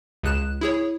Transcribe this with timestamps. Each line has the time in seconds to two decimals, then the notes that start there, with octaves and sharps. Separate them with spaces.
0.23 C#2 C#3 F#6 E7
0.61 E4 G#4 C#5